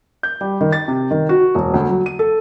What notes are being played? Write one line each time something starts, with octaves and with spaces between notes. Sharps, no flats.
G6
G3
D#3
A6
C3
D#3
F#4
E1
D2
F#3
D#7
A4